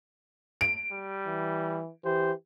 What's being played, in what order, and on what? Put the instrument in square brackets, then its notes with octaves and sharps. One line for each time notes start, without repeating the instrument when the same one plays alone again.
[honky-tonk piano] D7
[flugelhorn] G3
[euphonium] E3
[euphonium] E3 [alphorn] G4 [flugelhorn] C5